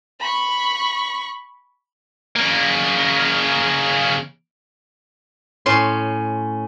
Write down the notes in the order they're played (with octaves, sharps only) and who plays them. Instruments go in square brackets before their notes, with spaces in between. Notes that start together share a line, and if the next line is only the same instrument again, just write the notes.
[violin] B5 C#6
[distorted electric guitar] C#3 A#3
[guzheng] A2 C#4 C6